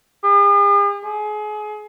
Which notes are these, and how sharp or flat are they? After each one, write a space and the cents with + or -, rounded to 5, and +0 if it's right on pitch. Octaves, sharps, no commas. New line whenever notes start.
G#4 -45
G#4 +30